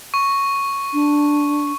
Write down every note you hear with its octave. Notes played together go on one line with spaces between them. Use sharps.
C#6
D4